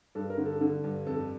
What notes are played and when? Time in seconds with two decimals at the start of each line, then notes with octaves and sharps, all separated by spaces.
0.15 G2 A4
0.30 A#4
0.38 D3
0.45 A4
0.61 D3
0.84 G2
1.06 F2 A4